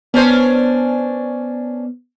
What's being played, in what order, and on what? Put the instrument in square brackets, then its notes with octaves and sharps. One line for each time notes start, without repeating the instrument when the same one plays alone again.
[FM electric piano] B3 [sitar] C#4 D4 C5